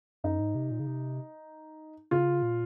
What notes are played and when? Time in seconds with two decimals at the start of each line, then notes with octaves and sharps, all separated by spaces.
0.24 F#2 D#4
0.39 G#2
0.55 C3
0.71 A#2
0.80 C#3
0.87 C3
2.11 C#3 F4
2.42 A#2